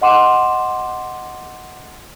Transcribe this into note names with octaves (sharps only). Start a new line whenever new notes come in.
D#5 F#5 C6 D6 E7